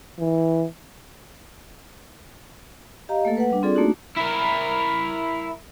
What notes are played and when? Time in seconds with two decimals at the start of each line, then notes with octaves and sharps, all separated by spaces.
0.19 E3
3.09 G4 D#5 F5 A#5
3.25 A3 A#3 A4
3.37 B4 F#5
3.50 G3 D4
3.63 C4 F4 G#4 A4 D5
3.75 A3 A#3 D4 D#4 F#4
4.17 E4 A#4